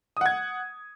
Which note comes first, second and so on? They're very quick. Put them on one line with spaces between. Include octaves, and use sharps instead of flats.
D#6 F#5 G#6